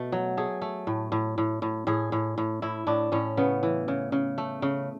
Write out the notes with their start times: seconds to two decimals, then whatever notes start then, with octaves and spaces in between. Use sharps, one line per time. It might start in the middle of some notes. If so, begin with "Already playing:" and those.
Already playing: B2 A3
0.12 F#3
0.37 A3 G#4
0.62 A3
0.87 A2
1.12 A2
1.38 A2
1.62 A2
1.87 A2 G#4
2.12 A2
2.38 A2
2.62 A2 E4
2.87 A2 D4
3.12 A2 C#4
3.37 C#3 B3
3.63 E3
3.88 C#3
4.12 C#3
4.38 A3
4.62 C#3